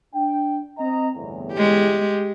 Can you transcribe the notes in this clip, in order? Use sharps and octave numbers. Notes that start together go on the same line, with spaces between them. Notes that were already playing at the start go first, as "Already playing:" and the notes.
D4 G5
C4 D#5 A#5
G1 E2 A2
G#3 G4